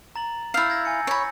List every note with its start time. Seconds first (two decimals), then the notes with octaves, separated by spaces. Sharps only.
0.16 A#5 A6 F#7
0.54 E4 F5 E6 G6 A6
0.70 G#6 A#6
0.85 G#5 C#7
1.07 C#5 B5